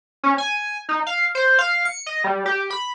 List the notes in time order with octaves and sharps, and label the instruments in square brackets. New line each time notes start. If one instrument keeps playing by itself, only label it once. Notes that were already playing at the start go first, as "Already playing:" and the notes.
[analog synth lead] C#4
G#5
D#4
F5
C5
F5
C#7
D#5
G3
G4
B5